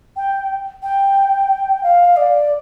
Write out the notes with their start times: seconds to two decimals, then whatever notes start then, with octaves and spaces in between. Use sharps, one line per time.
0.16 G5
0.83 G5
1.83 F5
2.16 D5